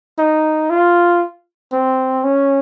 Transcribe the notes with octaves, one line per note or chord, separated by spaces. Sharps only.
D#4
F4
C4
C#4